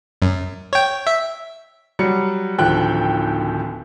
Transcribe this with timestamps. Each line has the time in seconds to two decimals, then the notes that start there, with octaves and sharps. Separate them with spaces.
0.22 F#2
0.73 C#5 G5
1.07 E5
1.99 F#3 G3 F#4 C#7
2.58 D1 D#2 F3 G5 F#6